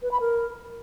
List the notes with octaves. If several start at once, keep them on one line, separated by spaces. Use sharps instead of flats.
B4
B5
A#4